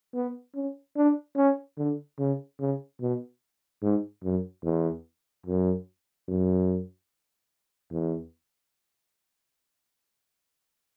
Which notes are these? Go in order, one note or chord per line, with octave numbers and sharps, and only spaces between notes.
B3
C#4
D4
C#4
D3
C#3
C#3
B2
G#2
F#2
E2
F#2
F#2
E2